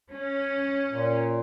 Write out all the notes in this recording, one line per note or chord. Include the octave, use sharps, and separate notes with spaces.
C#4
A#2